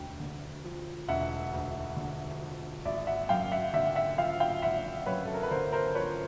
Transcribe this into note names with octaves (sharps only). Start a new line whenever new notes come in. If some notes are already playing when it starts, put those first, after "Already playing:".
Already playing: E1 D2 G5
D3
F3
E1 E5 F#5
D2
D3
F3
G#1 D5 E5
E5 F#5
F#2 F5 G5
E5 F#5
D3 E5 F#5
E5 F#5
F3 F5 G5
F5 G5
G#1 E5 F#5
F#2 B4 C#5
A4
A#4
B4
D3 A#4 C5
A#4 C5
F3 B4 C#5